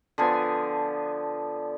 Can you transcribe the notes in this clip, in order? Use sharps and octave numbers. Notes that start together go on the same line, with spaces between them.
D3 F3 B3 G#5